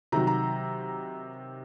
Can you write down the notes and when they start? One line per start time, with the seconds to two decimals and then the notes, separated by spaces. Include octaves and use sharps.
0.12 C3 D#3 F#3 A#5
0.27 A#5